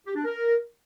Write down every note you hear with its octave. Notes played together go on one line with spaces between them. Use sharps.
G4
D4
A#4